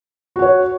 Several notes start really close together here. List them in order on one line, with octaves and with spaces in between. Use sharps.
F#4 F#5 C#5